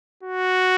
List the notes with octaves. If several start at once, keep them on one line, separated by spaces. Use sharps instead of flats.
F#4